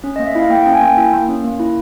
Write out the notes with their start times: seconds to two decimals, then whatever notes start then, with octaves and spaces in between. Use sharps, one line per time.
0.04 C#4
0.16 D#5
0.19 A#3
0.27 E5
0.35 E4 F5
0.50 A#3 G5
0.62 G5
0.66 C#4
0.74 G#5
0.81 A#3 G5
0.97 E4
1.13 A#3
1.29 C#4
1.44 A#3
1.59 E4